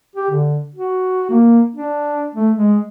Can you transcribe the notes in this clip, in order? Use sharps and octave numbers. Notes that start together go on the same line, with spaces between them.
G4
D3
F#4
A#3
D4
A3
G#3